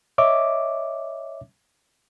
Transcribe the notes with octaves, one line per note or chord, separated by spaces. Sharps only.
C#5 D#5 E5 D6